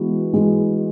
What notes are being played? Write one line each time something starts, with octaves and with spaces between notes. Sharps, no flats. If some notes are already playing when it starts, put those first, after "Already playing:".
Already playing: E3 G#3 B3 F#4
E3 G#3